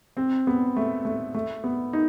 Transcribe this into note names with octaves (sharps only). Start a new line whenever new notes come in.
C4
B3
A3
A3
A3
B3
D#4